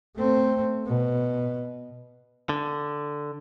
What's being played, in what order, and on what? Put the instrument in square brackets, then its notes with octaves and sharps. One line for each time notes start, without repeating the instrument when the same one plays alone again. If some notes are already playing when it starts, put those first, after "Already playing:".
[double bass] A3 C4
B2
[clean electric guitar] D3